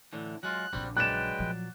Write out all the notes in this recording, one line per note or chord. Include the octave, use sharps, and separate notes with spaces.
A2 D3 E3
F#3 G#3 F4 F#6
A#1 C#3 G3 C4 F#4
F#3 G#3 B4 D5 G5 F#6 E7
A#2 F3